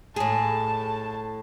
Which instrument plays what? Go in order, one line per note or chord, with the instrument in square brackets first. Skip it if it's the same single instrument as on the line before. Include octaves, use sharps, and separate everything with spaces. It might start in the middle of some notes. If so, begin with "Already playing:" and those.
[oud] A2 G#4 [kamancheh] A5